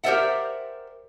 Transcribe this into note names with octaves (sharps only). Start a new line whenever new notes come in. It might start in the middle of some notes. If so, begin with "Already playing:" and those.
G4 A#4 C5 D5 E5 F#5